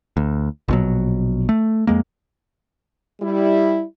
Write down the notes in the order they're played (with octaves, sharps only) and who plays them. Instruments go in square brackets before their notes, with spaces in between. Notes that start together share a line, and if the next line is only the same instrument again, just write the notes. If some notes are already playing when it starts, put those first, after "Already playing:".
[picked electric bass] D2
A#1 B2 F#3
A3
F2 G#3 A#3
[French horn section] G3 E4